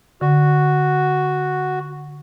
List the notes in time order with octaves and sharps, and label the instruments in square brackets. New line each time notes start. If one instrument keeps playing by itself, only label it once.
[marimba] D3 [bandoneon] F#4